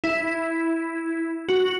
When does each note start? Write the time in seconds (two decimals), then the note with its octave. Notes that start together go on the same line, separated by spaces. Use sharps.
0.04 E4
1.49 F#4